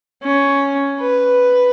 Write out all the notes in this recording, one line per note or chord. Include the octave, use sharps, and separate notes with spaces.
C#4
B4